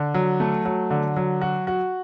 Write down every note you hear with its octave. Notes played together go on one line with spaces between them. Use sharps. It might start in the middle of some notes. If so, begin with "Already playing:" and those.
Already playing: D3
F#3
A3
F#3
D3
F#3
F#4
F#4